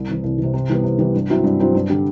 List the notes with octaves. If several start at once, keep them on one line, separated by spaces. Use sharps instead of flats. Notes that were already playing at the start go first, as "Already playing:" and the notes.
Already playing: C2
C3 E3
C2
E3
C3
C3
E3 G3 B3
C3
E3 G3 B3
G2
F#3 C4 E4
G2
F#3 C4 E4
G2
D3 G3